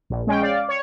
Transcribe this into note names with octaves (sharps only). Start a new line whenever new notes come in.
A#1
G#3 C#4 G5
D5 F5
C#5